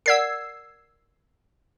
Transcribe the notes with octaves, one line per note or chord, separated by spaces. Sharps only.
A#4 D5 F#5 E6 G#6 C7